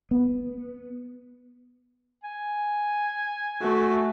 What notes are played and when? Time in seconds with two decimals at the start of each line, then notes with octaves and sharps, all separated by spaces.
0.11 B3
2.23 G#5
3.61 A3 F#4